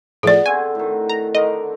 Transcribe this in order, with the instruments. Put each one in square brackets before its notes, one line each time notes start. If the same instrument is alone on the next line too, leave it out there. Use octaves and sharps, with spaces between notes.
[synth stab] A2 F3 A3 [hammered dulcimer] B3 [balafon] G#4 D5
[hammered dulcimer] D3 C4 F#4 [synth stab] G#5
[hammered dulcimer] A2 D#3
[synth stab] A#5
[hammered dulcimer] D3 D#3 A#4 [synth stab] D#5